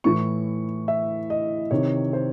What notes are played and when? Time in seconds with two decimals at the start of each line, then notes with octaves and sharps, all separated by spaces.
0.04 A2 E3 C#6
0.88 E5
1.30 D#5
1.71 C3 D#3 C#5
2.13 C5